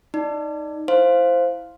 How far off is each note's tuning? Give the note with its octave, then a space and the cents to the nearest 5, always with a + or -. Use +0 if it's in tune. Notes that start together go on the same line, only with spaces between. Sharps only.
D#4 +0 D5 +0
E4 +0 C5 +0 F5 +0